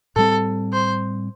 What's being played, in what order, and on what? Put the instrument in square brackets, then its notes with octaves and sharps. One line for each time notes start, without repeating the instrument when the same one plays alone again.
[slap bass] A2 G3 C4 [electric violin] A4
[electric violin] C5